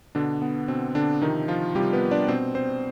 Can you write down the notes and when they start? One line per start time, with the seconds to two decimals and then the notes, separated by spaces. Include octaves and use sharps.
0.15 B2 D3 D4
0.42 B3
0.68 B2 C4
0.95 D3 D4
1.21 C3 D#3 D#4
1.26 F3
1.48 F3 F4
1.75 C3 G3 G4
1.79 F3
1.93 B3 B4
2.11 D4 D5
2.28 B2 C4 C5
2.55 C4 C5